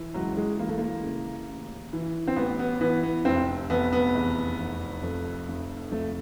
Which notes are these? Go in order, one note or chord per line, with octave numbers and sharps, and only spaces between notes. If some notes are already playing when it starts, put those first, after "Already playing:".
Already playing: E3
C#2 F#3
G#3
E3 A#3
A3
A#3
C#3
A1
E3
C4
A1 B3
B3
E3 B3
B3
F1 C4
F1 B3
B3
E2
F1
F2
F1
F2 A3